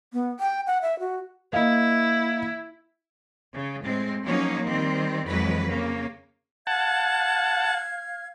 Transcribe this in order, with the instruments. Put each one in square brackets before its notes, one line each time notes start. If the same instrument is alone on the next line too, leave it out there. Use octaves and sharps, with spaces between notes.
[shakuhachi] B3
G5
F#5
E5
F#4
[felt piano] A#3 D#5 F5 [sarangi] E4
[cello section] C#3
A2 G#3 C4
F3 F#3 A#3 C#4 D#4
D#3 G3 C4
F2 E3 F#3 G#3 B4
C#3 A#3
[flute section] F5 F6 G#6 [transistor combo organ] F#5 A5